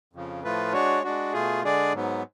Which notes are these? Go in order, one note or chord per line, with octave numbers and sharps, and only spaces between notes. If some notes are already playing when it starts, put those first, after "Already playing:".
F2 C#3 F3
A2 F3 A3 F4 B4
G#3 D4 F#4 C#5
G#3 D4 F#4
B2 A3 F4 G#4
D3 G#3 D4 G#4 D5
G#2 F#3 B3